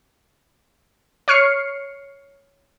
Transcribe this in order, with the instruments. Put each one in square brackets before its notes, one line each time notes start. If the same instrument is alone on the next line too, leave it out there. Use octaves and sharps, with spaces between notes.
[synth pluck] C#5 C#6 F6 C7 C#7